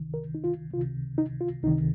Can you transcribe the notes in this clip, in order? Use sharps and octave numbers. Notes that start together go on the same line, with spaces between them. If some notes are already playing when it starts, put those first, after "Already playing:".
Already playing: C#2 C3 D#3
A#4
D#4
F4
C#2 C3 D#3 F4
D#4
F4
C#2 C3 D#3 D#4